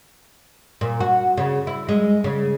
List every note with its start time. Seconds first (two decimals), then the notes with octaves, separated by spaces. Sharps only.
0.81 A#2
1.01 F#4
1.37 C#3
1.67 E4
1.89 G#3
2.24 C#3